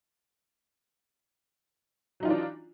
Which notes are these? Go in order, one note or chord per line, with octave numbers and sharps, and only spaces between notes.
E3 F#3 D4 D#4 F4